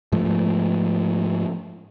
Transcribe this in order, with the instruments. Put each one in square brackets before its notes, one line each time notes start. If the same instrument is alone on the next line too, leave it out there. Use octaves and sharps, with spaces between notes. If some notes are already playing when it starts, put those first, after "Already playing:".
[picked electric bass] G#2 F3 A3